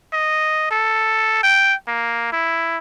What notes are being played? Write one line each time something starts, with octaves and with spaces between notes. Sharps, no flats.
D#5
A4
G5
A#3
E4